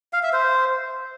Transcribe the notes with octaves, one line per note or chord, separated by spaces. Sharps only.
F5
E5
C5